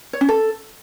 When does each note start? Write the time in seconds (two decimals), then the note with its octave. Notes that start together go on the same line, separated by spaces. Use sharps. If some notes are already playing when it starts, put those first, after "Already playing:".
0.13 C#5
0.21 C#4
0.29 A4